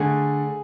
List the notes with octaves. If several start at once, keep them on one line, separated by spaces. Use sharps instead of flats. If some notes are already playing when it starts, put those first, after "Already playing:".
Already playing: D3 A3 G#4